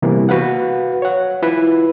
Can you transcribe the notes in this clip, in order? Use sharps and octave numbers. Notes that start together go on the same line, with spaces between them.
C3 E3 G3 A#3 B3
F#4 B4 F5 F#5
C#5 F#5
E4 F4 B4